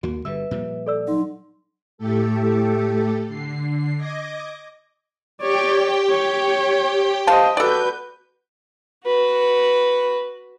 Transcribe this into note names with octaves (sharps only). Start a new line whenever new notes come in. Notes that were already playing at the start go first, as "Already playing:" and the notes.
D#2 A#3 F#4
G1 D3 G3 B4 E5 E6
A#2 F3 G3
A4 D5 E6
F#3 D#4 C6
A2 A3 G4 A4
D3 C7
D#5 D6 G#6 A#6
G4 C#5 D5 G5
C#5
C5 D#5 F5 A5
F#4 A4 B4 D5 G6
F#4 B4